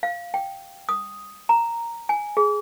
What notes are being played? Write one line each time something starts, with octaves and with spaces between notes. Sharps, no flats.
F5
G5
D#6
A#5
G#5
G#4